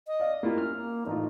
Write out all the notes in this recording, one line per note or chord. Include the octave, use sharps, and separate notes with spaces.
D#5
D5 F5
A#3 E4 F4 G4
C#4 F6
A#3
A1 D#4 F4